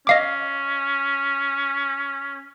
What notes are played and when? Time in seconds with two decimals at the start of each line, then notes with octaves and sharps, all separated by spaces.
0.07 C#4 D#5 F5 D6